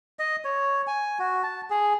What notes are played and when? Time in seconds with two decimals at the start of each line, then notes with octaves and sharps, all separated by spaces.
0.19 D#5
0.45 C#5
0.87 G#5
1.19 F#4
1.43 A5
1.70 G#4